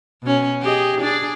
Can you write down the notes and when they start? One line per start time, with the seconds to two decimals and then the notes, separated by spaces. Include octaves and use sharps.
0.22 B2 C#4
0.62 G4 G#4 D#5
1.01 D4 G#4 D5